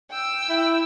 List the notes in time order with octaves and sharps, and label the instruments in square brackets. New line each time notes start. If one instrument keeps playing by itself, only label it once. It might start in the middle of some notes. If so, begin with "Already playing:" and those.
[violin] G5 E6
[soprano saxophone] E4